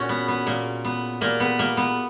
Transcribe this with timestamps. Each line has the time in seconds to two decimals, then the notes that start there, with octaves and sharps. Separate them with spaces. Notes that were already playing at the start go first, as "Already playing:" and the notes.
Already playing: A#2 C#4 F#4
0.09 B3
0.28 B3
0.46 A#2 A#3
0.85 B3
1.21 A#2 A#3
1.40 B3
1.59 A#3
1.77 B3